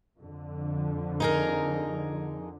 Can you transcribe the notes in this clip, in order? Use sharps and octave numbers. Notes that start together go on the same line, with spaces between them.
F2 D3
D#4 G#4 A#4